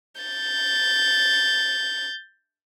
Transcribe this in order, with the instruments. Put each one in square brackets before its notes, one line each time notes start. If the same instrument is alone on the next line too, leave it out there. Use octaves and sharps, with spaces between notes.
[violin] G6 A6